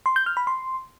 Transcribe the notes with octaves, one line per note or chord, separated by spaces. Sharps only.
C6
G6
F6
B5
C6